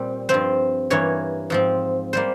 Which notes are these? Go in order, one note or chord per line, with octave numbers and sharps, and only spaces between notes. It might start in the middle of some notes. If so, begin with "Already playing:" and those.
Already playing: A#2 G3 C4
G2 F3 C4 C5
G2 E3 A#3 C#5
G#2 F3 C4
G3 A#3 C5